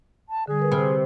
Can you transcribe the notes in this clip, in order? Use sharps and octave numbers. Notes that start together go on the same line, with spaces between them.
A5
D3 G3 G#4
A#4 B4
C3 B5 F6